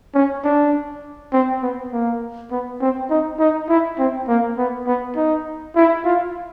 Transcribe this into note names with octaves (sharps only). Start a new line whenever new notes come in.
C#4
D4
C4
B3
A#3
B3
C4
D#4
D#4
E4
C4
A#3
B3
B3
D#4
E4
F4